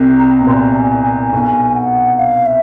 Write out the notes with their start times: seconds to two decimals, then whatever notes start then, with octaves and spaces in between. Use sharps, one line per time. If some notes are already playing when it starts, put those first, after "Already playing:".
Already playing: C2 C3
0.19 A#5
0.40 B2
0.47 A#2 C6
0.51 A#5
0.76 G#5
1.04 G#5
1.32 B1 B2 G#5
1.75 F#5
2.18 F5
2.46 E5